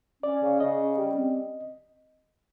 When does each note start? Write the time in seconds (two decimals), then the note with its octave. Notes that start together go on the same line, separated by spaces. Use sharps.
0.22 C#4 D5
0.41 C#3
0.59 C#3 D#5
0.78 C#4
0.97 G3
1.15 C4